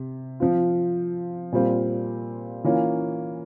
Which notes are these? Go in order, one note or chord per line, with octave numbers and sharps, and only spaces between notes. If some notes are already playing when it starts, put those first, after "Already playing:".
Already playing: C3
F3 C4 F4
A#2 G3 C4 F4
E3 A#3 C#4 F4